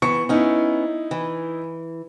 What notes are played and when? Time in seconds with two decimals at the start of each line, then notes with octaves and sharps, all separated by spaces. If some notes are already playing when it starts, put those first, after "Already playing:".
0.02 E3 B3 C#6 C#7
0.29 B3 C#4 D#4 E4
1.11 E3